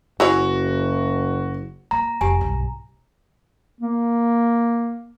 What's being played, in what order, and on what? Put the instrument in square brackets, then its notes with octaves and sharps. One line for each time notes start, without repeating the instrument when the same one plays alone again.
[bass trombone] F#1 [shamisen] E4 G#4 C#5 [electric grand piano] F#4
[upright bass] A#3 [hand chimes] A#5
[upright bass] F1 [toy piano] G4 G#5
[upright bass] B1 G2
[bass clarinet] A#3